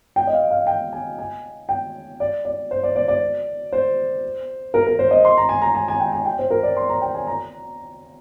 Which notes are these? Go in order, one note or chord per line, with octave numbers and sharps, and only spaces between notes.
G5
D#5
F5
F5
G5
G#5
G#5
G5
D5
D5
C5
D5
D5
D5
C5
A#4
A#4
C5
D#5
C6
A#5
G#5
A#5
G#5
G#5
G5
G#5
G5
C5
A#4
D5
C6
A#5
G5
G#5
A#5